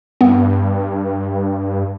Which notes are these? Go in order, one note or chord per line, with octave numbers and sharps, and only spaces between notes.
G2 B3